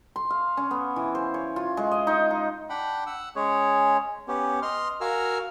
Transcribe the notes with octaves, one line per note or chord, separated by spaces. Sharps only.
C6
F5
C#4
B3
E3
C5
C#5
F4
G#3
D#5
D#4
A#5
D4 F#5 G5 B5
F#5 E6
G#3 C#4 G#4 C#5
B3 C#4 G4
D#5 C6 F6
F#4 A#4 F5 G#5 E6 F6